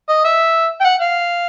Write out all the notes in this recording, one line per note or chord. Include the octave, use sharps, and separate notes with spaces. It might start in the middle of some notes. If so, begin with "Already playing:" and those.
D#5
E5
G5
F#5
F5